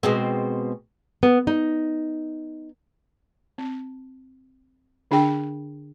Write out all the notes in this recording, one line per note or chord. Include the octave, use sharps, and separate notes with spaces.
B2 G#3 C4
B3
D#4
C4
D3 D4 G#4 G5